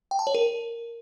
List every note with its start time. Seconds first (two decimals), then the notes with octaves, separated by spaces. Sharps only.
0.11 G5
0.19 A5
0.27 C#5
0.35 A#4